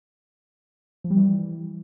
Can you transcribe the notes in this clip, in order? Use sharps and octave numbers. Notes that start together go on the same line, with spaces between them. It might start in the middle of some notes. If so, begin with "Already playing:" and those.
F3
G3
E3